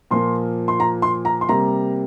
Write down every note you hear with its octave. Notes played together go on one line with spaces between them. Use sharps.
A#2 F3 A#3 C6
C6
A#5
C6
A#5
C6
C3 G3 A#3 A#5